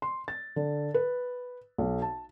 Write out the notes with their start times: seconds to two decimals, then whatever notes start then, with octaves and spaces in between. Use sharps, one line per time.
0.02 C6
0.28 A6
0.56 D3
0.94 B4
1.78 B1
2.02 A5